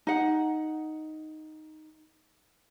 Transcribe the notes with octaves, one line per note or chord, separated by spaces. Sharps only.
D#4 F#5